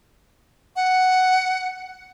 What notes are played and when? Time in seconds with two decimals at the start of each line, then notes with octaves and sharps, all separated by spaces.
0.76 F#5